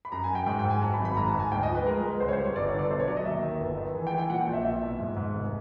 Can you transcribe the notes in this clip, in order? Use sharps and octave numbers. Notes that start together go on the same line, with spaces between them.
B5
F#2 A#5
G#5
F#2
G5
G#2 G5
G5
G#2
G#5
F#3 A5
B5
G#1
B5
G#2 A#5
A5
G#2
G#5
D2 G5
D#5
F3
B4
G#3 A#4
A#4
G#3
B4
C#2 C5
C#5
C5
G3
C#5
G1 D5
C#5
D3
D5
B1 C5
C#5
F#3 D5
D#5
D#2 E5
D#3
G1
D#3
E3
G5
E3
G5
A#2 F#5
G5
A#1
E5
A#2 E5
B1
G#2
G#2
F1